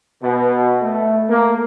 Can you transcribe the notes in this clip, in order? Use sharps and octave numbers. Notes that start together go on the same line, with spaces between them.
B2
A3
A#3